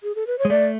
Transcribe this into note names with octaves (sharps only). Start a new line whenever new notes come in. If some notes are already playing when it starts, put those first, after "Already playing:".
G#4
A4
B4
C#5
G#3
A3 D5